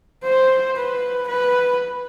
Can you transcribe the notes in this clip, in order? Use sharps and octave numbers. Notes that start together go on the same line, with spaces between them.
C5
B4
B4